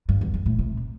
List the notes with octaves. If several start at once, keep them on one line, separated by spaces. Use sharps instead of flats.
G2
E2
G2
A2
C3